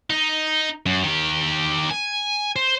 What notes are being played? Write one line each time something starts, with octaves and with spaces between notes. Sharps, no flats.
D#4
F#2
D#3 G4
G#5
C5